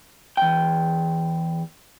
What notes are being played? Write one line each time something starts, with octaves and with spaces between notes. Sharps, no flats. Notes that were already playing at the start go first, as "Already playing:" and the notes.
E2 G5